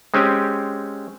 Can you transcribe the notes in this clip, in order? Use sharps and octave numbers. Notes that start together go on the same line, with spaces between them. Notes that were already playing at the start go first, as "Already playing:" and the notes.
G#3 C4 C#4 G4 G#5